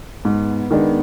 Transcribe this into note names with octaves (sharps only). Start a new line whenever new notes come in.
G#2 B3
D#3 G#3 D4